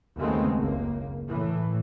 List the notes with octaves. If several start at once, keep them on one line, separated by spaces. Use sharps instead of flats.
D#2 C#3 G#3 A3 B3 C4
F#1 C#2 A#3
A2 E3